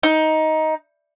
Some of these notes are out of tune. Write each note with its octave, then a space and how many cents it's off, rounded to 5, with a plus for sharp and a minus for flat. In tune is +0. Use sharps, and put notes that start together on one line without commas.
D#4 +15